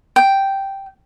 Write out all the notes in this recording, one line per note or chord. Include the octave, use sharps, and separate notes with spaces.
G5